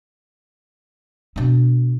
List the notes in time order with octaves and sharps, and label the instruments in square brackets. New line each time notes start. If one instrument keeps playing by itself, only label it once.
[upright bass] B2 D4